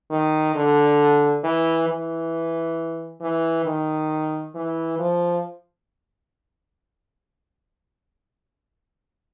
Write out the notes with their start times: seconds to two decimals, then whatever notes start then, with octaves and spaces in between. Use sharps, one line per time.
0.10 D#3
0.55 D3
1.44 E3
1.89 E3
3.21 E3
3.65 D#3
4.55 E3
4.99 F3